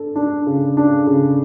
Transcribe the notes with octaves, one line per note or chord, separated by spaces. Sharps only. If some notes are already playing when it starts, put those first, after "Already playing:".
Already playing: D4 A4
D4
C#3
D4
C#3